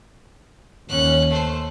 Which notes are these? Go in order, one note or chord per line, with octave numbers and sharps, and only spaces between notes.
D#2 C#4 F#6
A3 C5